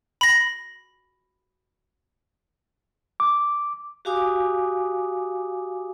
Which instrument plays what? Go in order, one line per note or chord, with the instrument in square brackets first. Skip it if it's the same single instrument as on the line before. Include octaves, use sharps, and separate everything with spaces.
[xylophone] B5 A#6
[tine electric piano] D6
[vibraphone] F#4 G4 F5 G#5 D6 D#6